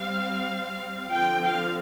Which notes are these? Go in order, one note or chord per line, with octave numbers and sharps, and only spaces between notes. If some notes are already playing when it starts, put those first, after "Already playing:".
Already playing: G3 C4 F5
D3 F3 C4 G5
F5